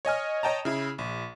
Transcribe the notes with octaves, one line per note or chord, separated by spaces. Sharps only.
C#5 D#5 G#5 F6
C#5 D#5 G5 A5 A#5
C#3 E4
A#1